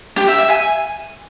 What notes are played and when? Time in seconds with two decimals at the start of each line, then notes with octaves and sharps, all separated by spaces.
0.18 G4
0.29 E5
0.40 E5
0.51 G#5